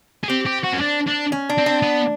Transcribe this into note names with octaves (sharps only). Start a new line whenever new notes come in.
G#4
C4 G4
G4
F#4
C#4
D4
D4
C#4
D4
C4
D4
B3